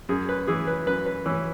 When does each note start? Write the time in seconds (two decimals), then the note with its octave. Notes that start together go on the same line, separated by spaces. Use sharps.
0.09 F#2 G#4
0.29 B4
0.47 E3 G#4
0.67 B4
0.86 F#2 B4
1.06 B4
1.26 E3 C#4